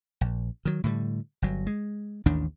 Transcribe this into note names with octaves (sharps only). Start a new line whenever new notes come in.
A#1
D#3 F#3
A2 D3 D#3 G3
G1 F#3
G#3
A1 D#2 D#3 D4